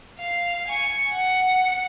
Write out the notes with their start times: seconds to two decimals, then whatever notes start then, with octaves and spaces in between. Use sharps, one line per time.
0.19 F5
0.68 G#5 C#6
1.12 F#5